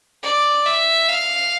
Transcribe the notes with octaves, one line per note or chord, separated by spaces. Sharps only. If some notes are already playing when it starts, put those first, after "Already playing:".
D5
E5
F5